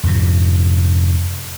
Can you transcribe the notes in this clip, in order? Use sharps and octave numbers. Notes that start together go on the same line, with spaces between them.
F2 G#2 C3